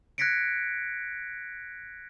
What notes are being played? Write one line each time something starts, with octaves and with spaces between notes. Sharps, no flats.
F#6 G#6 A#6 B6 C#7 D7